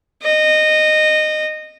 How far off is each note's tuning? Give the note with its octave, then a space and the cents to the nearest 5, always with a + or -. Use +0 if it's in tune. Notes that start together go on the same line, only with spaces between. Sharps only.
D#5 -15